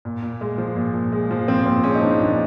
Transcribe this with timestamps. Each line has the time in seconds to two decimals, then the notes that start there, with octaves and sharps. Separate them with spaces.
0.05 A#2
0.22 A#2
0.41 G#3
0.58 F3
0.76 A#2
0.94 A#2
1.12 G#3
1.31 F3
1.48 A#2 C4
1.66 A#2 C4
1.83 G#3 C#4
1.95 D#4
2.01 F3 D4
2.20 A#2 D4